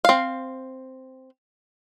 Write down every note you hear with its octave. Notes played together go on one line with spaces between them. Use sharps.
C4 F5